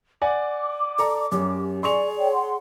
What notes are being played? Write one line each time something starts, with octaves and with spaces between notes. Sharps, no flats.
D5 F#5 G#5 D6
A4 D5 A#5
F#2 C#4 G4
G#4 D5 G#5 C6 C#6 F7
C#5 D5 G5
F#5 C6